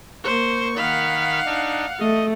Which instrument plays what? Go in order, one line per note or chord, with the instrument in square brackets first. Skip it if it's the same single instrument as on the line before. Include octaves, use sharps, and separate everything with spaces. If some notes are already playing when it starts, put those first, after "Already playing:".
[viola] A#3 C5 [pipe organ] C#6
[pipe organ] D#3 B5 [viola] F5 F#5
[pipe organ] D4 D#4
[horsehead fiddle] A3 [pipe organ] D#5